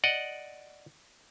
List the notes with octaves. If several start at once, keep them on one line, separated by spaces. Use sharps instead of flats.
D5 D#5 F#5